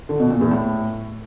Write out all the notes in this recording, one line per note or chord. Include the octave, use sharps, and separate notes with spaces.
D3
B2
A#2
E2
A2